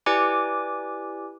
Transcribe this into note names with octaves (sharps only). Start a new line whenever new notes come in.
E4 G4 B4 D5 G#5 D6